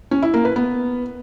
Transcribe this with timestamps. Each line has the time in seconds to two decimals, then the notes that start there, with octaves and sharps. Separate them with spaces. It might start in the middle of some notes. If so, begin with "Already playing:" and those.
0.11 C#4
0.22 E4
0.34 A#3
0.45 B4
0.56 B3